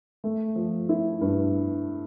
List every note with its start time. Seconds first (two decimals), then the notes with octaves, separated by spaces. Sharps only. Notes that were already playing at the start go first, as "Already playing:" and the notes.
0.24 A3
0.56 F3
0.89 E4
1.21 G2